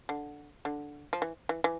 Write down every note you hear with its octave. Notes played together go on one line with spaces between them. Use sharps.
D3
D3
F3
E3
E3
E3